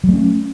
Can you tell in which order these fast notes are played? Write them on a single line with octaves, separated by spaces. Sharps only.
F#3 A3 C#4